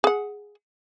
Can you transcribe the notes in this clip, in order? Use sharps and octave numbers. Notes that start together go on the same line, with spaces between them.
G#4 F#5